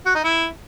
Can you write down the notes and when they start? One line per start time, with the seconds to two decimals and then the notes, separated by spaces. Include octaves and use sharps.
0.06 F#4
0.15 D#4
0.24 E4